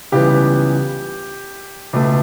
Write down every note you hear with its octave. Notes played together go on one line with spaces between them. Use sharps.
C#2 C#3 E3 G3 B3 G4
C#2 B2 A3